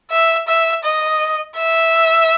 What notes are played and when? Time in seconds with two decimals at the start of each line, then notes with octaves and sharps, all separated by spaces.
0.11 E5
0.48 E5
0.84 D#5
1.58 E5